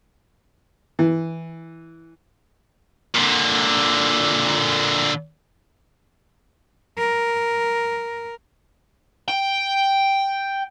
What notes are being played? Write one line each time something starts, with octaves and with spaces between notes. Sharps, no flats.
E3
A#2 D3
A#4
G5